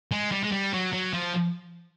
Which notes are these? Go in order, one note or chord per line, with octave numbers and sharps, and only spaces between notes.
G#3
G3
G#3
G3
F#3
F#3
F3